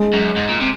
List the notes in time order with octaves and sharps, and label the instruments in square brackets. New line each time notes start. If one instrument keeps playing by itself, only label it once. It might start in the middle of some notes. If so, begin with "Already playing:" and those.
Already playing: [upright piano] G#3
[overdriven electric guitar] F#2
G#2
A#2
C3